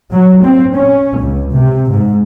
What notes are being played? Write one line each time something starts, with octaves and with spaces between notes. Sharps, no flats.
F#3
C4
C#4
C#2
C3
G#2